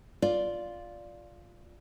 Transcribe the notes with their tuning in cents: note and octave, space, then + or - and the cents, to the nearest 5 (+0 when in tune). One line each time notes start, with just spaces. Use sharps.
F4 +0 D5 +0